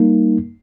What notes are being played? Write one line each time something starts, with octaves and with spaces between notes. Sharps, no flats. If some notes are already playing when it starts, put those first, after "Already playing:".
Already playing: G3 A#3 D#4